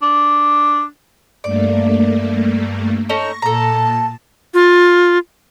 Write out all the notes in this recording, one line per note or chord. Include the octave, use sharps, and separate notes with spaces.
D4
G2 A3 A#3 D5
C#4 D#4 A4 C#6 A#6
A#2 A4 A5 A#5
F4